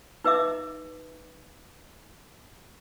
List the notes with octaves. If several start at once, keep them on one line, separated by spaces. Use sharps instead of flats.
D#4 B4 D#5 E5 D6